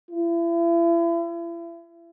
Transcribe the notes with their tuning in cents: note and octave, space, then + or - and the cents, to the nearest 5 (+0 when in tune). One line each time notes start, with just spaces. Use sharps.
E4 +40